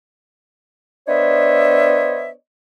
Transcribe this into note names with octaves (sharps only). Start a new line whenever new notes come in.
B3 D4 C5 C#5 D#5 E5